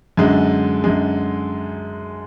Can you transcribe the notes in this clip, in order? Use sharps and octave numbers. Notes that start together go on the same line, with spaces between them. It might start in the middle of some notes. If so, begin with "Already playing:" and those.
F#2 D3 G#3
F#2 D3 G#3